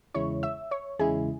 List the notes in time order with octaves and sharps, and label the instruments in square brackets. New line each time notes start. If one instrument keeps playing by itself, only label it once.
[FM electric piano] E2 C#3 G#3 E4 [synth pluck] C#5 C#6
[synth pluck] E5 E6
C#5 C#6
[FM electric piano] E2 C#3 G#3 E4 [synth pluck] G#4 G#5